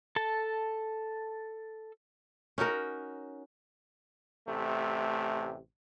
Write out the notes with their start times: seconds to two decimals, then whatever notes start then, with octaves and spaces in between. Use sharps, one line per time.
0.16 A4 A5
2.58 C#4 D#4 F#4 A#4
4.47 A1 C3 A3